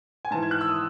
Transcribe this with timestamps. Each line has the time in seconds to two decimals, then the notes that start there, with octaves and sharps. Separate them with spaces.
0.25 G#5
0.31 G#2 E3 A5
0.43 G#6
0.51 F#6
0.61 E6
0.69 E3 D#6